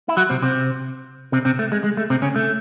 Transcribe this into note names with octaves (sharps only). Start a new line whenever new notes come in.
E4
F#3 F#4
C3 C4
C3 C4
C3 C4
C3 C4
A3
G#3
G#3
A3
C3 C4
C#3 C#4
A3